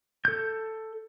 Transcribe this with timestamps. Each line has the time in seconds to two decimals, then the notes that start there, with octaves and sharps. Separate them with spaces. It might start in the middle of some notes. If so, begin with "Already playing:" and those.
0.25 A4 G6